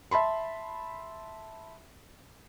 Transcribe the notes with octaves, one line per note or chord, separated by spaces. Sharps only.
E5 A5 B5 C6